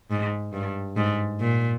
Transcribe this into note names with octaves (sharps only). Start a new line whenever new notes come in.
G#2
G2
G#2
A#2